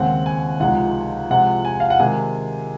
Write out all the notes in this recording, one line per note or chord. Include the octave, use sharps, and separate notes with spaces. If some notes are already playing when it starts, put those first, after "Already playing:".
Already playing: D#2 C#3 G#3 C4 F#5
G#5
C#2 C3 F3 G#3 D#4 F#5
C3 F3 G#3 F#5
G#5
F5
F#5
C3 D#3 G#3 G#5